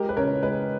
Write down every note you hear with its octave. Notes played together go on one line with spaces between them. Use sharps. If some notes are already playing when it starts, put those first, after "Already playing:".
Already playing: G#3 G4 A#4
B4
C#3 A#4 C#5
G#3 B4 D#5